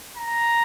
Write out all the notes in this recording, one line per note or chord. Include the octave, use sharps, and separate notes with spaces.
A#5